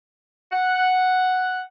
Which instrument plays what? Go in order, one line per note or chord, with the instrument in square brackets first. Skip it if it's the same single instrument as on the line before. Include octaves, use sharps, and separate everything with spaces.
[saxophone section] F#5